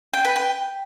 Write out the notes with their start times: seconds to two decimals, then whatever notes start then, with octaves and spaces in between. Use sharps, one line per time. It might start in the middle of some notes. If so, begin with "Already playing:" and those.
0.14 G5
0.25 B4
0.36 G5